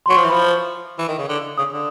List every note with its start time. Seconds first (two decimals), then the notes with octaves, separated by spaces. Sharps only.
0.06 C6
0.09 F#3 C#6
0.17 F3
0.24 E3
0.29 F3 B5
0.98 E3
1.08 D#3
1.18 C#3
1.29 D3
1.58 C#3 D#6
1.73 D3